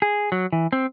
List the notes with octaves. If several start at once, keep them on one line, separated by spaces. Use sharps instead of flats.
G#4
F#3
E3
C4